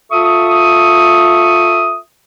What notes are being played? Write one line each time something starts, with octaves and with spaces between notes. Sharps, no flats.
F4 A4 E5 C#6 D#6